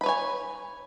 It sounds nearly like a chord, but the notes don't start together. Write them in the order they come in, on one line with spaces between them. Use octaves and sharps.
B5 B4 C#5 G#5